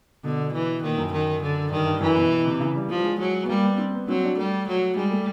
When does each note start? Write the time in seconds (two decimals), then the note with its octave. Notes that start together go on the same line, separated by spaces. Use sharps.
0.24 B2 D3
0.53 E3
0.83 A#2 D#3
0.97 F#2
1.12 D#3
1.42 D3
1.71 G2 D#3
1.86 G2
2.01 F#2 E3
2.16 B2
2.31 B2
2.46 C3
2.60 C#3
2.75 G3
2.90 F3 G3
3.04 G#3
3.19 F#3
3.43 B3
3.48 G3 A#3
3.63 B3
3.78 C4
3.94 B3
4.08 F#3 C4
4.23 D4
4.38 G3 A3
4.68 F#3
4.96 G3 G#3
5.11 A3